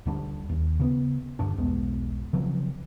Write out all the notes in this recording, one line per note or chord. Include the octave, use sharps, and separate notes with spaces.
D2 D3 G3 D4
D#2
C#3 B3
D1 D2 G2 D4
B1 E2 G#3 B3
C#3 F3 F#3 C4